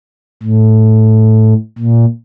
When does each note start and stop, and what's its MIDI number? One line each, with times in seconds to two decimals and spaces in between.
0.43 1.54 45
1.78 2.05 46